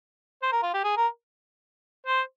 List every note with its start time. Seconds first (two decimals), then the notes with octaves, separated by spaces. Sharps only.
0.43 C5
0.52 A#4
0.63 F4
0.74 G4
0.84 G#4
0.97 A#4
2.06 C5